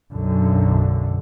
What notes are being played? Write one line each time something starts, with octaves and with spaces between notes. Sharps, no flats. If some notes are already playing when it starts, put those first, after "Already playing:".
B1 F#2 D3